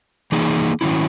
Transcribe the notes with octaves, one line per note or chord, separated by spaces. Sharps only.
E3 A#3 D#4 G#4
D#3 F#3 C#4 E4